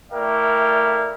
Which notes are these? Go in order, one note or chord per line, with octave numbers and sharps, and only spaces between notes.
A3 E4 A#4 D5 F5 G5